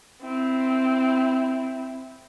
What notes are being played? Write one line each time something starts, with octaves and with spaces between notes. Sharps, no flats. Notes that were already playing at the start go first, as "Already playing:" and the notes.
C4 E4